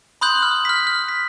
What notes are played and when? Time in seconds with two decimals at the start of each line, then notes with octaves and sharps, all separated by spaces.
0.21 B5 C6 D#6 F#6 G6 F#7
0.42 F6
0.65 F6 B6
0.87 F6
1.08 B6